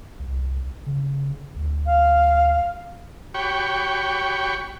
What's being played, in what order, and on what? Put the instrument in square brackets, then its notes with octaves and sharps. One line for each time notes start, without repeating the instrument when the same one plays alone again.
[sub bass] C2
C#3
D2
[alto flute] F5
[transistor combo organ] F#4 G4 C#5 G5 B5 C#6